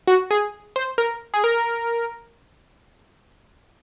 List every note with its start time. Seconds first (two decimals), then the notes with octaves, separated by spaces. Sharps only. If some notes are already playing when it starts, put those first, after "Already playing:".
0.07 F#4
0.31 G#4
0.76 C5
0.98 A#4
1.34 G#4
1.44 A#4